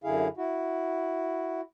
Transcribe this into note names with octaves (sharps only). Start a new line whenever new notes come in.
F#2 D3 E4 G#4 F5
E4 F#4